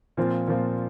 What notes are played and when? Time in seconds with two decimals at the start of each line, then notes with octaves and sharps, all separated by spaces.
0.17 A#2 F3 C4 F4
0.47 A#2 F3 C4 F4